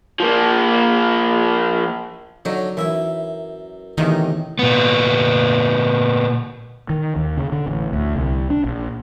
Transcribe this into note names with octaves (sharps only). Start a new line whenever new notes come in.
F3 A#3
D3 F#3 C#4 D#4
F#2 E3 E4 E5
A1 E2 C3 D#3 D#4 G#5
A#2 B3
D#3
D#2
C#3
D3
A1
D2
C2
D4
A#1